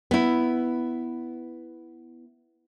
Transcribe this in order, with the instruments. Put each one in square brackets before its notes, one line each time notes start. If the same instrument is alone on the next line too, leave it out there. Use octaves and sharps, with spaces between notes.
[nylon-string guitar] B3 E4